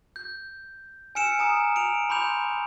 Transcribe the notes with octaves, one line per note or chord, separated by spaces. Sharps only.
G6
G#5 E6 F6 C#7 D7 E7
G#5 A#5 D#6 D7
D7 F7
B5 C6 D6 G6 F7